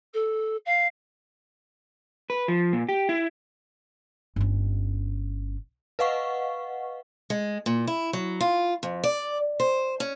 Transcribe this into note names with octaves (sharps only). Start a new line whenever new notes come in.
A4
F5
B4
F3
A#2
G4
E4
G1 C#4
B4 D#5 F5 F#5 C#6
G#3
A#2
E4
F#3
F4
F2
D5
C5
C#4